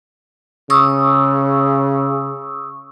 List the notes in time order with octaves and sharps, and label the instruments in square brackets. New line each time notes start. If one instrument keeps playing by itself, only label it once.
[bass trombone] C#3 [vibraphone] C#6 D#6 E6